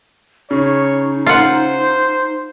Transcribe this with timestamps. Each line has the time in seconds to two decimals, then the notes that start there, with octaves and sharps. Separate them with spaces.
0.51 C#3 D#4 C#5
1.26 F4 C5 F#5